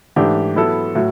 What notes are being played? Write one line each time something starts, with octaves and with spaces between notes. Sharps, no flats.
G#2 E3 A3 D4 G4
F#3 B3 E4 A4
A2 F#3